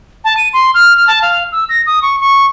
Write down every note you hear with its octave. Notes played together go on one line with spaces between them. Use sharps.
A5
D#7
C6
F6
F6
A5
F5
E6
A#6
D#6
C#6
C#6